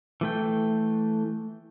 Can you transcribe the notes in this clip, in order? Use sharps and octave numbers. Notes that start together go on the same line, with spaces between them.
E3 A3 G5